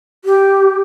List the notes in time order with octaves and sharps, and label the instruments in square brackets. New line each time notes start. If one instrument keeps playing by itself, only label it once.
[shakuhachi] G4